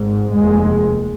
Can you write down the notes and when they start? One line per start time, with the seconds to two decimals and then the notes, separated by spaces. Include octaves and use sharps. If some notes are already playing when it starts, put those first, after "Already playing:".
Already playing: G#1 G#2
0.33 F1 D#2 G#3